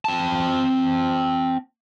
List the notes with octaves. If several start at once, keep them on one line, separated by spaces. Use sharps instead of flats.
C4 A5